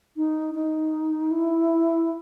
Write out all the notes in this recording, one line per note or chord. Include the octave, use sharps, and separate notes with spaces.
D#4
D#4
E4